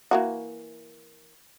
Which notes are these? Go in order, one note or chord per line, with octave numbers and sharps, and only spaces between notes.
E3 A#3 F#4